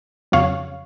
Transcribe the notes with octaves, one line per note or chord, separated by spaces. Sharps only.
F2 C#3 F#3 C#5 F5